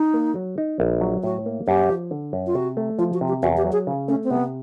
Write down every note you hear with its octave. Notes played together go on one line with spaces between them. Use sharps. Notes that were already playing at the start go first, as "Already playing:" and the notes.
Already playing: D#4
A#3
F#3
D#4
A#1
F#3
A2 F#4
A#3
F#2 G4
F3
D3
F#2
F4
C3 F#4
A3
F3 F4
F#4
C3
G4
E2 F#4
G4
F#3
G#4
C#3
A3 C#4
C4
C3 B3